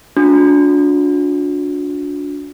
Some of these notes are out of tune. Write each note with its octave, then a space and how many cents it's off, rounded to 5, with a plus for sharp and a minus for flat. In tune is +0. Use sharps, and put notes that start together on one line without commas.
D4 -20 F#4 -45